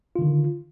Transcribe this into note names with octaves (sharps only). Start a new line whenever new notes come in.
D3 D#3 F4